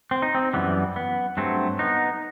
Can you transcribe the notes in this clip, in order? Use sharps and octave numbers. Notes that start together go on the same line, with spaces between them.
C4
D#4
C4
F#2 E3 G3 B3
B3
G2 F#3 A3 C4
B3 D#4